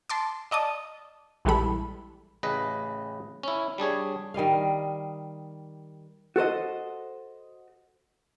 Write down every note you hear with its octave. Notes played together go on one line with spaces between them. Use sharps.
A5 C6 D6
D5 D#5 A5 D#6
A#1 E3 G3 G#3 A4 B5
A1 C#3 B4 D#5
C#4 E4
G3 D4 G#4 C#5
D#3 G3 D#5 F5
F#4 A4 C5 D#5